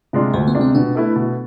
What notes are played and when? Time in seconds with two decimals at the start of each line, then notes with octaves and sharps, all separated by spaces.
0.13 C3 G#3 D4 F4
0.33 D2 A3
0.48 B3
0.54 C3 G#3 D4 F4
0.61 C4
0.75 B2 D4
0.95 A3 E4 B4
1.16 B2